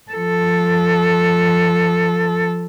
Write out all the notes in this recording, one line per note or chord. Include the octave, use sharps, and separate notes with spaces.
F3 A4